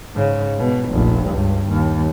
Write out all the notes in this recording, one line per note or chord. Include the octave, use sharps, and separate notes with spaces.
G#2 C#3
G#2 B2
F1 A#1
C#2 G2
D#2